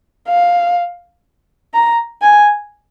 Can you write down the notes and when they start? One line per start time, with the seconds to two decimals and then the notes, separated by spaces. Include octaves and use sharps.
0.28 F5
1.74 A#5
2.22 G#5